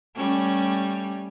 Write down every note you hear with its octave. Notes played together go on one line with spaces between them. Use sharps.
G3 A3 C#4